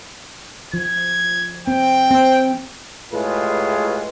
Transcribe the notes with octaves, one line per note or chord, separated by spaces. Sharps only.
F3 G#6
C4 G5
C4
A2 G#3 F4 G4 G#4 B4